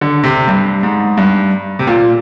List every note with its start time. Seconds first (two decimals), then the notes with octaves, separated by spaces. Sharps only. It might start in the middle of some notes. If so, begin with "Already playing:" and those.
0.01 D3
0.23 C3
0.48 G2
0.83 G#2
1.17 G2
1.79 C3
1.87 A#2